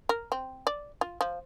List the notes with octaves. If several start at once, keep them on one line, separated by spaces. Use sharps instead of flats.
A#4
C4
D5
F4
F3